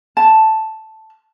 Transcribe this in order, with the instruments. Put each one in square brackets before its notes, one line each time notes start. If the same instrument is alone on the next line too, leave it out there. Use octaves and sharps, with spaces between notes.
[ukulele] A5